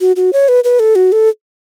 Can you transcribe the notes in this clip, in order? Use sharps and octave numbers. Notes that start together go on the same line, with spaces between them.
F#4
F#4
C#5
B4
B4
A4
F#4
A4